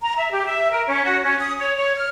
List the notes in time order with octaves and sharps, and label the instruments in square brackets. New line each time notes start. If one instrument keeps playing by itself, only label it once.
[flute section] A#5
E5
G4
E5
A#4
C#4
F#4
C#4
D#6
C#5
C#5
F6